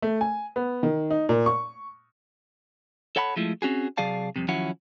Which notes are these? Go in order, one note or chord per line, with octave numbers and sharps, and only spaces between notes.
A3
G#5
B3
D#3
D#4
A#2
C#6
A4 C#5 F#5 A5 B5
F3 G#3 A3 E4
C4 C#4 F#4 G#4
C3 F#3 G#4 D5 F5 A5
C2 F2 C3
D#3 F3 F#3 C#4 E4 F#5